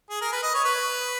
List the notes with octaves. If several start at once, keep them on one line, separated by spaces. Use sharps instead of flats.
G#4
A#4
B4
D#5
C#5
B4